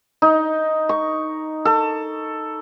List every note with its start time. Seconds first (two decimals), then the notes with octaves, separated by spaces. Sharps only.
0.22 D#4
0.89 C#6
1.65 A4